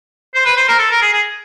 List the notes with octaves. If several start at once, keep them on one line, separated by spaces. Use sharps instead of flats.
C5
B4
C5
A#4
A4
A#4
G#4
G#4